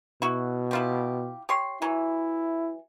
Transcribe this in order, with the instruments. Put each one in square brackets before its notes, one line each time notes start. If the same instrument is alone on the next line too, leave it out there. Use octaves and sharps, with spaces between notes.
[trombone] B2 [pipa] E4 F#4
[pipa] E4 F4 G4
G4 C#5 C6
[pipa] E3 F#3 [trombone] E4